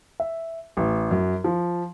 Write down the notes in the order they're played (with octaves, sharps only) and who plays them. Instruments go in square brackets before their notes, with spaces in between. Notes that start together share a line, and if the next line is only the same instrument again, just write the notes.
[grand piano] E5
A1
F#2
F3